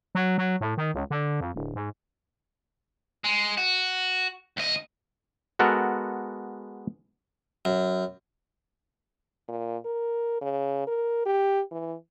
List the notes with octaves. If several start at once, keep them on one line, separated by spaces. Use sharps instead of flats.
F#3
F#3
A2
D#3
C#2
D3
F2
D1
G#2
G#3
F#4
D2 D#5
G#3 B3 F#4 A4 A#4
F#2
A#2
A#4
C#3
A#4
G4
E3